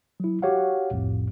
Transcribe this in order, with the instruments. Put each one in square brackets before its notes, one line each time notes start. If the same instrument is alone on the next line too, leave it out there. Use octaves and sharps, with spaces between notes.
[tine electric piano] F#3 E4
F#4 G4 C#5 F5 F#5
C2 F2 A2